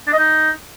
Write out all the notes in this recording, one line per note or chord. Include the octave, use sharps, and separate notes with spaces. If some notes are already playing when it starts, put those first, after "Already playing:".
D4
D#5
D#4